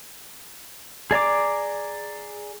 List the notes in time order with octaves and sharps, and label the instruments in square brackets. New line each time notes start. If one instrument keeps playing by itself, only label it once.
[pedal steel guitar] G#4 D5 A#5 D6